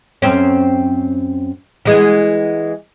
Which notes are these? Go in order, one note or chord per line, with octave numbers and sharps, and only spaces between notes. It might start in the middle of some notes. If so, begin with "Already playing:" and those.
F#2 C4 C#4
E3 G#3 B3